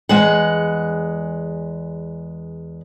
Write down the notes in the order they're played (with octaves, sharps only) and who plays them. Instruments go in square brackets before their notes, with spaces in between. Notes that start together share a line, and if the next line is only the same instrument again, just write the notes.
[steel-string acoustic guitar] E2 G#3 F#5